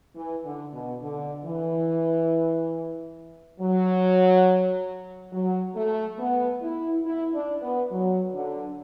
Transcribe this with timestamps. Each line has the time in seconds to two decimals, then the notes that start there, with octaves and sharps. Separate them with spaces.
0.16 E3
0.44 D3
0.74 B2
1.02 D3
1.44 E3
3.60 F#3
5.33 F#3
5.76 A3
6.18 B3
6.62 E4
7.05 E4
7.34 D4
7.62 B3
7.91 F#3
8.33 D3